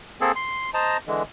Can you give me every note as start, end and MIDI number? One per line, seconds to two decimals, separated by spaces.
0.21 0.32 58
0.21 0.32 60
0.21 0.32 68
0.21 0.32 69
0.36 0.70 84
0.74 0.97 72
0.74 0.97 75
0.74 0.97 81
0.74 0.97 82
1.07 1.23 50
1.07 1.23 52
1.07 1.23 56